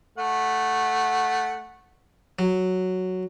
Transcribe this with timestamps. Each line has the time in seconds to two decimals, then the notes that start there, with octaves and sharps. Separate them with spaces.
0.18 A3 F#5
2.39 F#3